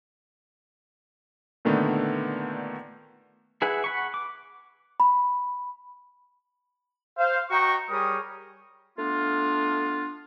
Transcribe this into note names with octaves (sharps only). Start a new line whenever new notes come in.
A#2 D3 D#3 A3 B3
E4 G#4 B4 F#5
F#5 B5 C#6
D6
B5
C5 F5
F#4 D#5 G5 A#5 C#6
G3 G#4 A#4 C#5 D#6
A3 B3 D4 F4